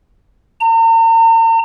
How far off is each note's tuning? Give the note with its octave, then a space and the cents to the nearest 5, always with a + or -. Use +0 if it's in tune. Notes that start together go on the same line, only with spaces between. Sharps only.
A#5 -45